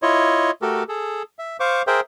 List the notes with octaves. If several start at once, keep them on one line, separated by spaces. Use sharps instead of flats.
E4 F4 C#5 D#5
A3 F#4 G4 A4 A#4
G#4 A4
E5
C5 F5 C#6 D6
G#4 A#4 C5 E5 G5